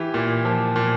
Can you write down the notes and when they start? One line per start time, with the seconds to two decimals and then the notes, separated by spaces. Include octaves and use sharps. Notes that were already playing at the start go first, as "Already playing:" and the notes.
Already playing: E3 G4
0.14 A#2
0.45 F3
0.76 A#2